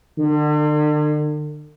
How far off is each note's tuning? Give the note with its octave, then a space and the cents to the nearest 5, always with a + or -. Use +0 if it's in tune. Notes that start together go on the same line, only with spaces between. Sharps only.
D3 +40